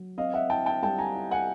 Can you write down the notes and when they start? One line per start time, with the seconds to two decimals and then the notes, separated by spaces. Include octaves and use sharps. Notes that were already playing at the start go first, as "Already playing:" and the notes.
Already playing: F#3
0.18 C4 D#5 F5
0.34 E5 F#5
0.50 E4 G5 A5
0.66 G5 A5
0.82 G3 G5 A5
0.98 G#5 A#5
1.15 E4
1.31 F#5 G#5